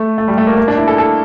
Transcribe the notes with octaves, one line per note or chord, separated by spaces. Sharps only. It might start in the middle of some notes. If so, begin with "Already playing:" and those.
Already playing: A3
A3
G3
A3
A#3
A#3
D4
E4
A4
A4